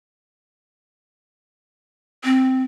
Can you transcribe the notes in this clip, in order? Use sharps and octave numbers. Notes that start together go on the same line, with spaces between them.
C4